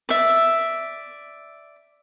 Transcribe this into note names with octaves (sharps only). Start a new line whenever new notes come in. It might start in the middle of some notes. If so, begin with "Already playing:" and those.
D5 E5